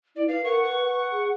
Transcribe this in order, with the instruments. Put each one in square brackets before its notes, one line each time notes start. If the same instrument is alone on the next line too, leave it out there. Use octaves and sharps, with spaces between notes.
[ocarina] E4 [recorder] D5
[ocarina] B4 [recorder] F5
[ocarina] A#4 [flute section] F#5 [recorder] C#6
[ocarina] B4 [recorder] C#6
[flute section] F#5
[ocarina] G#4